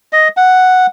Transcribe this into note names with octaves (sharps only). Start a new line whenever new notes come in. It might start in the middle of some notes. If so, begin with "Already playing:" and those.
D#5
F#5